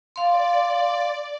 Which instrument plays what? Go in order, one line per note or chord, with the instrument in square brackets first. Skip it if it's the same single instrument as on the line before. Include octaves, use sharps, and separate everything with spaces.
[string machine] D5 [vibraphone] F5 C6